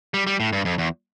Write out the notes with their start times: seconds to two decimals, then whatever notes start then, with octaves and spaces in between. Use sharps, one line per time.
0.14 G3
0.27 G3
0.40 A2
0.53 G2
0.65 F2
0.78 E2